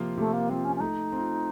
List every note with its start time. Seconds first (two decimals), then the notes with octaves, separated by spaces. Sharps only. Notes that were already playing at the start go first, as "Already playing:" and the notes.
Already playing: C3 F3 A#3 F4
0.17 C3 A3
0.33 A#3
0.49 F3 A#3 C4 F4
0.65 C#4
0.76 C#4
0.80 A3 D#4
1.12 C4 F4